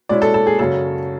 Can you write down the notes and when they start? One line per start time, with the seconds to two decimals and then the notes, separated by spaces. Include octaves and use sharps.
0.09 B2 G#3 C#4 E4 D5
0.22 A4
0.34 A4
0.47 G#4
0.59 F#2 C#3 F#3 A4